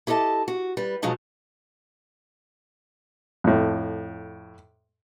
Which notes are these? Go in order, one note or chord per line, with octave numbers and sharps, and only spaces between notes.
E4 G4 A4 D#5 A5
F#4
G3 B4
B2 F3 F#3 G#3 D#4 F4
F2 A2